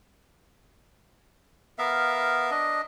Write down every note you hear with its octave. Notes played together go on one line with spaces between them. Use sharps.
B3 A#4 E5 F5
D4 D#5